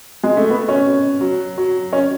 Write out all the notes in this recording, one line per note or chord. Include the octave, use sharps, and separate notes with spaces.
G#3
A3
B3
C#4
F#3
F#3
C#4